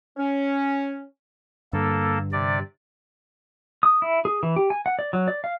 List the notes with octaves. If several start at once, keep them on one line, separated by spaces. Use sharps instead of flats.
C#4
G2 D3 A#3 A4
C3 D5
D#6
E4
G#4
E3
G4
G#5
F#5
D5
F#3
D5
F5